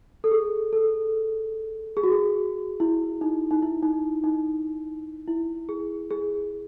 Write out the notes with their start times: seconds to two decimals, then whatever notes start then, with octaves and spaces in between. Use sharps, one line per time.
0.24 A4
0.31 G#4
0.73 A4
1.97 G#4
2.03 F#4
2.12 G#4
2.80 E4
3.21 D#4
3.51 D#4
3.63 E4
3.83 D#4
4.24 D#4
5.28 E4
5.69 G#4
6.11 G#4